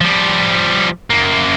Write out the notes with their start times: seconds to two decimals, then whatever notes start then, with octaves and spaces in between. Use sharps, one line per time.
0.01 F3 G3
1.10 F#2 A#3